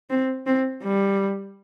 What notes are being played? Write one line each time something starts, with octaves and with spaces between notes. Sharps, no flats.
C4
C4
G3